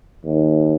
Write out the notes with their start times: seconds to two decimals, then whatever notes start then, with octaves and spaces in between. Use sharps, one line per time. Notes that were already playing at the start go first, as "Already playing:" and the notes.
0.24 D#2